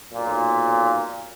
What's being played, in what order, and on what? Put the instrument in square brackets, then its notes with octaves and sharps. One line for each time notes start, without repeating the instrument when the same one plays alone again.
[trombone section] B1 A#2